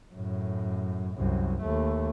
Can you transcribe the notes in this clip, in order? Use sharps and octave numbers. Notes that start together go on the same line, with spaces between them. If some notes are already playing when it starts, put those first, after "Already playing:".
F#2 A2
C2 F#2
D#2 A3